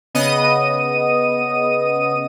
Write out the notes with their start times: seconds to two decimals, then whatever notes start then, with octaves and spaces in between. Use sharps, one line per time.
0.14 C#3 B3 D#5 D#6 D#7